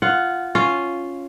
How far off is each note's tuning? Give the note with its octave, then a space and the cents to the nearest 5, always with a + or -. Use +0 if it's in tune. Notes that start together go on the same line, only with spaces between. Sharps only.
F4 -10 F#5 +0
C#4 +0 F4 +0